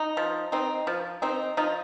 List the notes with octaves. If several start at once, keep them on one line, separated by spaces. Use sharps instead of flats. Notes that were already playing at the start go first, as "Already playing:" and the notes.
Already playing: D#4
F3
C4 D#4
F3
C4 D#4
F3 D#4